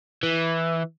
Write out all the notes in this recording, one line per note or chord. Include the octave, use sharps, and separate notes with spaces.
E3